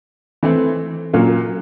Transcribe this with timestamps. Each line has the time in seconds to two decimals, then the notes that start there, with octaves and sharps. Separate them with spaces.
0.43 E3 A3 C4
1.13 A#2 F#3 A#3 C#4 F4